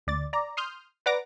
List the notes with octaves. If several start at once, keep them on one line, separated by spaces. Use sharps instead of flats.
D2 D5 A6
D5 A#5
C6 D#6 F6 G6
B4 D5 F#5 A#5 D6 A#6